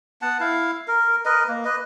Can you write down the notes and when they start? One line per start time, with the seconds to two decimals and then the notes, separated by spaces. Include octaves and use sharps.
0.22 B3 F#5 A5
0.40 E4 F5
0.88 A#4
1.25 A#4 B4 D#5
1.48 A#3
1.65 B4 D#5